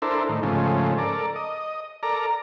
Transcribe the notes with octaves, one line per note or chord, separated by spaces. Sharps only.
D4 E4 A4 A#4 C5
A2 D#3
G#2 C#3 F3 A3
A4 A#4 D5
D#5
A4 A#4 D5 A#5